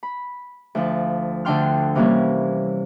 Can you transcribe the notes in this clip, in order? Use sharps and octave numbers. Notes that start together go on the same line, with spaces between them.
B5
D2 F3
D2 D3 D4 G5 C6 F6
C3 E3 G3 A#3 C#4